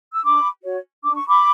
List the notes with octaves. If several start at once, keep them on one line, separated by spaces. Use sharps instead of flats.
E6
D4 B5 D6
F#4 C#5
D4 D6
C#6
B5 D6